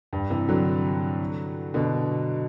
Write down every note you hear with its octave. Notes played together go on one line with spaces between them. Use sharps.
G2
C3 E3
D3 F#3
B2 D3